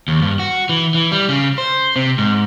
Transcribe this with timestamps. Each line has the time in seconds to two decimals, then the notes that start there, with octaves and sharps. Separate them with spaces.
0.08 D#2
0.22 G2
0.39 F#4
0.69 E3
0.94 E3
1.12 G3
1.29 C#3
1.58 C5
1.96 C3
2.18 G#2